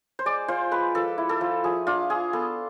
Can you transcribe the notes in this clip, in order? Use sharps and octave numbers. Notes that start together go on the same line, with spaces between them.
C5
G#3 D5
F4 C5
G#3 B4
F3 A4
E4
A4
F3
F3 G#4
D4 F4
F4 G#4
B3 A4